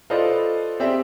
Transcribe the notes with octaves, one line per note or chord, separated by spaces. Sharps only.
F4 A4 B4 C5 D5 D#5
C4 G4 G#4 D5 E5